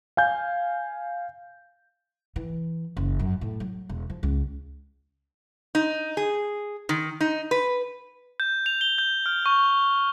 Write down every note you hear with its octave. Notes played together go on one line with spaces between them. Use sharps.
F5 G#5 G6
E3
F#1
F#2
A2
F#3
E1
F3
C#2
D#4
G#4
D#3
D#4
B4
G6
F7
G7
G6
F6
C#6